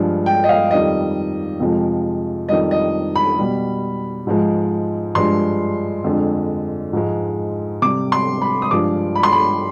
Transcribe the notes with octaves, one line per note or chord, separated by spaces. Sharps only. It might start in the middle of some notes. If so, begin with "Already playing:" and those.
Already playing: G2 F3 G#3
G5
D#5
F5
F2 D#3 G3 D#5
F2 C3 F3 G#3
F2 D#3 G3 D#5
D#5
B5
B2 G3
G#2 F3 G#3
G2 F3 G#3 C6
F2 D3 G#3
G#2 F3 G#3
C3 G3 D6
C6
B5
D#6
G2 F3 G#3 D6
B5
C6
B5